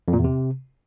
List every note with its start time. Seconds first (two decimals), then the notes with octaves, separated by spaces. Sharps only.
0.08 F2
0.13 A#2
0.19 E2
0.24 C3